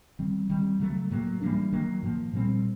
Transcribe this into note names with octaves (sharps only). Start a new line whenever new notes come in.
D#3 G3 C4
D#3 G3 C4
C#3 F#3 A3
A2 F#3 A#3
E3 G3 A#3 D4
D#3 F#3 A#3
A2 F3 A#3
A#2 G3 C4